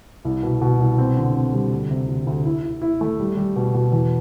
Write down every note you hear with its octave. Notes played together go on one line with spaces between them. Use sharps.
C2
B2
B2
C2
C4
D3
C4
G3
D2
C3
D2
D2
E4
E4
E4
A3
G3
G3
B2
B2
E2